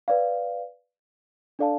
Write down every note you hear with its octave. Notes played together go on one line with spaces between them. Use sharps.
B4 D5 F5
D4 A4 D5 F5 A5